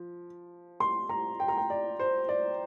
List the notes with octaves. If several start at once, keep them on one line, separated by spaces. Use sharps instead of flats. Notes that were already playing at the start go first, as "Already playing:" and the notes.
Already playing: F3
C6
A#5
G5
A#5
G5
D5
C5
D5